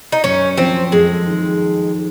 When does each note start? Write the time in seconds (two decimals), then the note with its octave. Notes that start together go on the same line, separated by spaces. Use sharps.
0.12 D#4
0.24 F#2 C#4
0.57 F3 C4
0.92 F2 G#3
1.27 D#3